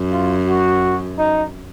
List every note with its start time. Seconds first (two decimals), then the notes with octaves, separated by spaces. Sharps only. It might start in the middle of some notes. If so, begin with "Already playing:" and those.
Already playing: F#2
0.12 F4
0.47 F#4
1.19 D#4